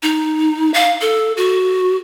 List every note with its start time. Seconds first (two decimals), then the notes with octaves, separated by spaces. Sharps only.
0.03 D#4
0.74 F5
1.01 A4
1.37 F#4